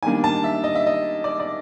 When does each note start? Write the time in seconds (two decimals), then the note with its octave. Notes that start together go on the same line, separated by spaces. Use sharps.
0.03 D#3 G3 A#3 D4 G#5
0.24 A5
0.44 E5
0.64 D#5
0.75 E5
0.87 D#5
1.24 D5
1.40 D5